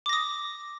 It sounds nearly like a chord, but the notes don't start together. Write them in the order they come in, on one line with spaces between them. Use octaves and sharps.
D6 A#6 D#6